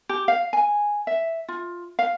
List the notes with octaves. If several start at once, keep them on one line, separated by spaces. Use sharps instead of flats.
G4
F5
G#5
E5
F4
F5